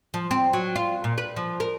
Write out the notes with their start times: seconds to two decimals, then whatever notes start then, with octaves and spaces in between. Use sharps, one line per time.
0.14 F3
0.31 C4
0.53 F#3
0.76 F4
1.04 A#2
1.18 B4
1.36 F3
1.60 A#4